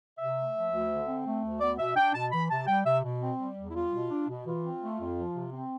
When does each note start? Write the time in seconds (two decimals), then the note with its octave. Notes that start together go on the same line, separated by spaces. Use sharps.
0.18 C3 E5
0.36 A3
0.54 F3
0.72 D2
0.90 D3
1.07 C4
1.26 A3
1.43 D2
1.61 B3 D5
1.78 B2 E5
1.96 D4 G5
2.14 B2 A5
2.32 E3 B5
2.50 C3 A5
2.67 G3 G5
2.86 C3 E5
3.03 B2
3.21 C4
3.39 G3
3.57 E2
3.71 E4
3.74 G3 F4
3.92 B2
4.10 D4
4.28 B2
4.46 E3 F4
4.64 C4
4.81 A3
4.99 F2
5.17 F3
5.34 C3
5.53 C4